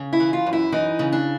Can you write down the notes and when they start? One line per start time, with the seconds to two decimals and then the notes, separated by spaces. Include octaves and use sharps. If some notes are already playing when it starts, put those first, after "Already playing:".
Already playing: C#3
0.13 E4
0.20 E3
0.33 F4
0.46 F#2
0.53 E4
0.72 E3 D#4
0.99 C#3
1.12 D4